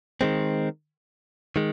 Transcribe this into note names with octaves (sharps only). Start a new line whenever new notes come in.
D#3 G#3 C4
D#3 G#3